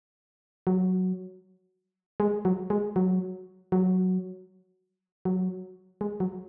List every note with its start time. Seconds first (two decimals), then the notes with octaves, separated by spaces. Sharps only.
0.67 F#3
2.20 G#3
2.45 F#3
2.70 G#3
2.96 F#3
3.72 F#3
5.25 F#3
6.01 G#3
6.20 F#3